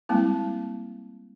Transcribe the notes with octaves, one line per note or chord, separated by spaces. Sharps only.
G3 G#3 A#3 C4 E4